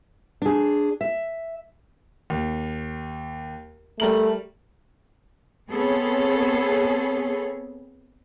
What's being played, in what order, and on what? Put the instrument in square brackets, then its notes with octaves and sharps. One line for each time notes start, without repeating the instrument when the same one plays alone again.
[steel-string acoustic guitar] D4 G#4
E5
[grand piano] D#2
[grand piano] G3 A#4 F#7 [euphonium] A3
[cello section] B3 C4 G#4 A4 C#5